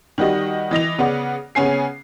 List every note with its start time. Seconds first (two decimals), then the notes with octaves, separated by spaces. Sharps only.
0.18 D#3 G3 F#4 D#5
0.71 E3 D#5 A#6 F7
0.98 C#3 B3 D5 F#5
1.55 C#3 B3 C#4 G#5 C7